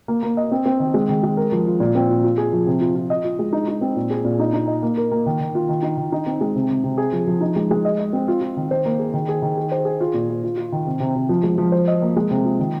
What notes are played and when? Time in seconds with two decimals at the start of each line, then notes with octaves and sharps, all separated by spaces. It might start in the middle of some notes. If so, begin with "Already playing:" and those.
0.08 A#3
0.23 A#3
0.37 D#5
0.52 C4
0.66 C4
0.80 D#3
0.94 G#3
1.09 D#3
1.23 G#3
1.37 A#4
1.52 F3
1.67 F4
1.80 A#2
1.95 C4
2.10 A#2
2.24 F4
2.38 G#4
2.53 F3
2.66 C3
2.81 F4
2.96 F4
3.10 D#5
3.24 F4
3.39 G#3
3.53 D#4
3.68 D#4
3.81 C4
3.96 A#2
4.10 G#4
4.25 A#2
4.39 D#4
4.53 D#4
4.68 D#5
4.83 A#3
4.98 A#4
5.12 A#3
5.26 D#3
5.40 D#3
5.55 F4
5.69 D#3
5.83 D#4
5.97 D#3
6.12 D#4
6.26 C4
6.41 G#3
6.56 C3
6.70 C3
6.84 C3
6.98 G#4
7.12 F3
7.27 F3
7.41 D#4
7.56 G#3
7.71 G#3
7.85 D#5
7.99 D#5
8.13 C4
8.28 F4
8.41 F4
8.57 D#3
8.71 C5
8.85 A#3
8.99 G#4
9.14 D#3
9.29 G#4
9.42 D#3
9.57 G#4
9.72 C5
9.85 G#4
10.01 F4
10.14 A#2
10.29 F4
10.44 F4
10.57 F4
10.72 D#3
10.86 C3
11.00 C3
11.15 C3
11.29 F3
11.43 G#3
11.58 F3
11.72 C5
11.88 D#5
12.02 A#3
12.16 G#3
12.31 C3
12.45 F4
12.59 D#3